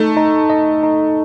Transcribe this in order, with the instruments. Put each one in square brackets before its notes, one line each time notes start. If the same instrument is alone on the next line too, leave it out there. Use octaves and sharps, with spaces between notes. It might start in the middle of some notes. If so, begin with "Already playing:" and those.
Already playing: [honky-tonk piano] A3 [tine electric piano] D#4
[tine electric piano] D#4
D#5
D#4